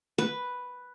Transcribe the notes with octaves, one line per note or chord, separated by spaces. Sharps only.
B4